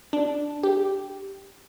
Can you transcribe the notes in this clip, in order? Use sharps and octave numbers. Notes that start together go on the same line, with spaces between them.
D4
G4